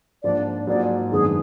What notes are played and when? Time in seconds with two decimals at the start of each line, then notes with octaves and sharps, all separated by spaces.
0.23 G#2 F3 A#3 D4 D5
0.67 G#2 F#3 A#3 F4 G#4 D5
1.12 F#2 D#3 G#3 B3 D4 G#4